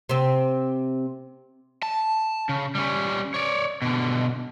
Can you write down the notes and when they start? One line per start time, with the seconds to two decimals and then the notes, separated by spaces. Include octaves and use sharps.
0.09 C3 C4
1.83 A5
2.49 C#3
2.75 G3 C#4
3.34 C#5 D5
3.82 B2 D3